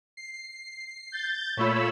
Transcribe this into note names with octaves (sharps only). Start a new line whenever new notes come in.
C7
G6 A6
A#2 A3 F4 C#5 B5 E6